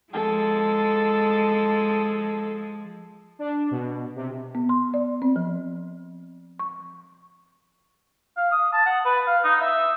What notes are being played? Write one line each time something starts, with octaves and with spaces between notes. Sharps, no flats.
F3 G#3 A4
D4
B2
C3
B3
C6
D5
C4
F3
C#6
F5
D#6
A5
F#5
B4
F5
D#4
E5